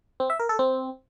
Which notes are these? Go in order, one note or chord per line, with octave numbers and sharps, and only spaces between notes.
C4
E5
A#4
A4
C4